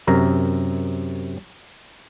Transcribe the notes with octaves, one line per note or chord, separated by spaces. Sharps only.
F#2 C3 A#4 A#5